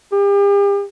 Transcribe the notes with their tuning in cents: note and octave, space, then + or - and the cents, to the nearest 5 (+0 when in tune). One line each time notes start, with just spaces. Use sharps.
G4 +40